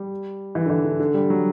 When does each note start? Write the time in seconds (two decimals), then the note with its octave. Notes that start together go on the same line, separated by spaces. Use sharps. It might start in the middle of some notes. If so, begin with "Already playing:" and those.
Already playing: G3
0.55 E3
0.66 D3
0.70 E3
0.85 D3
1.00 D3
1.14 G3
1.30 F#3